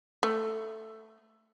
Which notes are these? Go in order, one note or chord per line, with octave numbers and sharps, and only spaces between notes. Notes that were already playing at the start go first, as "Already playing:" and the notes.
A3